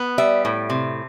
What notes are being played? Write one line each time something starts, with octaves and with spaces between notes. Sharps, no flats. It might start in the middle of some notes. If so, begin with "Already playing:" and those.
Already playing: B3
G3 E5
A2
C3